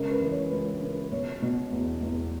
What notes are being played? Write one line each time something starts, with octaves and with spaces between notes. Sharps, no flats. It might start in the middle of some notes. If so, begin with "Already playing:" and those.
Already playing: C#3 G#3 A#4
B4
E3
C#5
C#2 B4
A#4
C#3
B4
B2 C#5
B2
E2
E2